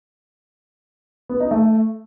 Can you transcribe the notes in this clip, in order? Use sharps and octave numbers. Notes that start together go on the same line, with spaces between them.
B3
D#4
A3